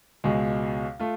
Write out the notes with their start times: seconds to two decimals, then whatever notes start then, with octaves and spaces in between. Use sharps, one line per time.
0.24 C#2 B2 G#3
0.99 A3 F4